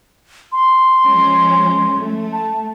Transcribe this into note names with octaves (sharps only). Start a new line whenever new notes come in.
C6
F3 G#3 C#4
A3
A5